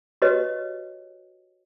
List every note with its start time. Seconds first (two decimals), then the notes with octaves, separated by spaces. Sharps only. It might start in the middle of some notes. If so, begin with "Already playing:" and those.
0.22 F#4 G4 B4 C#5 D#5